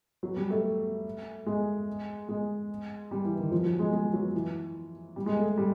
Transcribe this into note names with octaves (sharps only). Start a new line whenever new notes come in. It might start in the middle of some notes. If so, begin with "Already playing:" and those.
F#3
G3
A3
G#3
G#3
G3
E3
D#3
F3
F#3
G#3
G#3
F#3
E3
G3
G#3
A3
G3